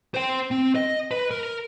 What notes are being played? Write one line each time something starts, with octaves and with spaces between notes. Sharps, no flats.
C5 G5
C4
D#5
B4
A#4